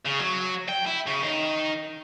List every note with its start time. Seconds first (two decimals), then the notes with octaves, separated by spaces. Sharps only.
0.05 C#3
0.19 F#3
0.69 G5
0.87 E4
1.07 C#3
1.24 D#3